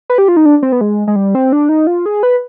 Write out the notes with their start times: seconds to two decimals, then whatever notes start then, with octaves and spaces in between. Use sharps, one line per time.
0.10 B4
0.18 G4
0.28 F4
0.37 D#4
0.45 D4
0.63 C4
0.72 B3
0.81 G#3
1.07 G#3
1.16 G3
1.35 C4
1.52 D4
1.69 D#4
1.87 F4
2.06 G#4
2.23 B4